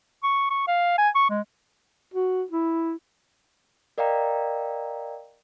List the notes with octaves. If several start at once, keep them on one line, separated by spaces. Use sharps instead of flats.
C#6
C#6
F5
G#5
C#6
G#3
F#4
E4
A#4 D5 D#5 F5 G5 A#5